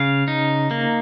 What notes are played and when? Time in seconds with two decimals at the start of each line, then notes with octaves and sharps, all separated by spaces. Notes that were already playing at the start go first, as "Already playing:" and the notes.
Already playing: C#3 F5
0.28 D#4
0.71 A#3